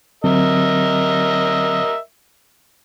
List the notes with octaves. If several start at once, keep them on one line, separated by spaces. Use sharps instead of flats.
D3 F#3 C4 A#4 D#5 E5